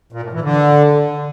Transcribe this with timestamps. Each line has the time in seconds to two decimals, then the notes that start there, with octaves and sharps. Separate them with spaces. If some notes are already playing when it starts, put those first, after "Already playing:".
0.12 A#2
0.22 A2
0.32 E3
0.42 D3